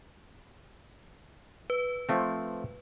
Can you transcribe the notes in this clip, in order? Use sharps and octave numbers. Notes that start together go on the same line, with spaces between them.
B4
F3 A3 C4